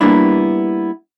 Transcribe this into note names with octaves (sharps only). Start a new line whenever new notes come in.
G3 A#3 B3 D4 E4